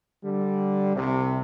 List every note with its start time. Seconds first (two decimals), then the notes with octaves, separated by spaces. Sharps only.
0.24 D3 G3
0.95 C2 C3